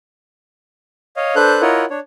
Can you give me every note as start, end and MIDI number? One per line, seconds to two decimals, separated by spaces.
1.16 1.35 73
1.16 1.35 75
1.16 1.35 77
1.36 1.62 62
1.36 1.62 69
1.36 1.62 71
1.36 1.62 72
1.36 1.62 90
1.36 1.62 91
1.62 1.85 64
1.62 1.85 65
1.62 1.85 70
1.62 1.85 73
1.62 1.85 75
1.62 1.85 78
1.90 1.99 62
1.90 1.99 73